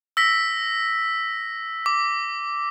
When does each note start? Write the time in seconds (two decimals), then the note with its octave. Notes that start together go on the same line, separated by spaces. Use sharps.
0.17 E6 A#6 B6
1.86 D6